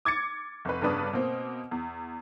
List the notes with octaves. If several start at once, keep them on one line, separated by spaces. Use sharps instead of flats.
D6 G#6 A6 C#7
F1 B4
G1 G2 C#3 D4 B4 D#6
B2 A#3 C4
E2